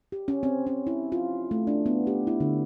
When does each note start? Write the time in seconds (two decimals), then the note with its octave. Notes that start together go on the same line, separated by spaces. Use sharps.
0.12 G4
0.28 C#4
0.43 C4
0.67 C#4
0.87 E4
1.12 F4
1.51 A3
1.67 D4
1.86 B3
2.07 G4
2.27 E4
2.40 D3